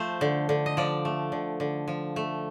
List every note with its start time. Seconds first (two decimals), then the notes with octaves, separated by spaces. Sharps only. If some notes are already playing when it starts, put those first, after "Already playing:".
Already playing: F3 A3 C5
0.21 D3
0.49 D3
0.66 D#5
0.77 F3 D5
1.05 A3
1.32 D3
1.60 D3
1.88 F3
2.16 A3